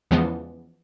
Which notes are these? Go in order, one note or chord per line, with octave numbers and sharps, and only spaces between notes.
E2 C#3 E3 F3 G#3 B3